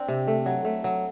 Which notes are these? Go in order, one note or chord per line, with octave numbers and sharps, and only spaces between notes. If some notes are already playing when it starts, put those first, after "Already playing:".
Already playing: C4 D4
C3
A3
F#3
A3
F#3